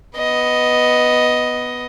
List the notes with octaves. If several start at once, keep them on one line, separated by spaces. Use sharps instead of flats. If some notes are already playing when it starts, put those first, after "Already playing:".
B3 D#5